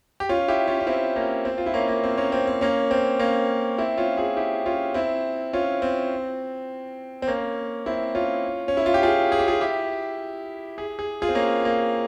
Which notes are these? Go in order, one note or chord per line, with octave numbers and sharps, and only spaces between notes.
G4
C#4 F4
E4 G4
C#4 F4
C#4
C4 E4
A#3 C#4
C4
F4
E4
A#3 C#4
A#3
C4
A#3 C#4
C4
C4
A#3 C#4
C4
A#3 C#4
C4 E4
C#4 F4
F4 G#4
E4 G4
C#4 F4
C4 E4
C#4 F4
C4
C4
A#3 C#4
C4 E4
C#4 F4
C#4
E4
F4
G4
F4 G#4
G#4
G4
F4 G#4
E4 G4
G#4
G#4
F4 G#4
C4
A#3 C#4
A#3